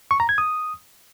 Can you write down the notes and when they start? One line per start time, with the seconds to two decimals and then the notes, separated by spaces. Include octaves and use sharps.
0.11 C#6
0.20 A#5
0.29 G#6
0.38 D#6